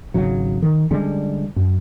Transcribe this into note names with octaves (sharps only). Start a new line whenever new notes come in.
G#1 C#3 F#3
D#3
D3 G3 G#3 C#4
F#2